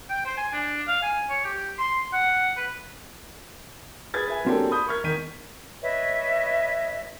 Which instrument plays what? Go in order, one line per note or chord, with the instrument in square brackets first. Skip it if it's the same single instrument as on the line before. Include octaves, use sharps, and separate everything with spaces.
[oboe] G5
C5
G#5
D4
F5
G#5
C#5
G4
C6
F#5
B4
[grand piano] G#4 B4 G#6 A6
B4 E5 G#5
F#3 A#3 C4 D4 G4 A4
B5 D#6 G6
A#4 C#6 F6 G#6
E2 D#3 G6 B6 D#7
[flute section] B4 C#5 D#5 E5